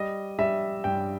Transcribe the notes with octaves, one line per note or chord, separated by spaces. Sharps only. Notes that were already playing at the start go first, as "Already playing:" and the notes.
Already playing: G3 D#5
G3 E5
G2 G5